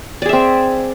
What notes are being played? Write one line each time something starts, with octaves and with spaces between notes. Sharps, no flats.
C4 G#4 D5 E5